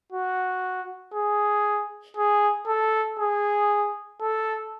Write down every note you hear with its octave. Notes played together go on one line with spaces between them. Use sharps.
F#4
G#4
G#4
A4
G#4
A4